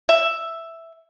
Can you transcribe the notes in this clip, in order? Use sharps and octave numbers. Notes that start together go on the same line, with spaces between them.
E5